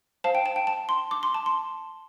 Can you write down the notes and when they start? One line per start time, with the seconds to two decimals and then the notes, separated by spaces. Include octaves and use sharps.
0.24 C5 F5 A5
0.35 G5
0.46 A5
0.56 G5
0.67 A5
0.89 C6
1.11 D6
1.23 C6
1.34 A5
1.46 C6